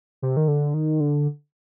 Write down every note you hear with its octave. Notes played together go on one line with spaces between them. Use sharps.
C3
D#3
D3
D#3
D3